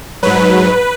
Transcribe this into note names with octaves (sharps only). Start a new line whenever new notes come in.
G#2 F#3 B4